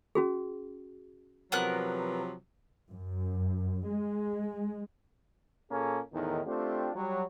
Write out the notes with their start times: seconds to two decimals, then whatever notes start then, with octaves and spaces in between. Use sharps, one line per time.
0.15 C#4 F#4 G#4
1.52 C3 F3 F#3 B3 A#4 F#6
2.90 F#2
3.85 G#3
5.71 A#2 A#3 C#4 G#4 A4
6.12 E2 A2 D#3
6.46 A3 C4 D4 F4 G4
6.95 F#3 G3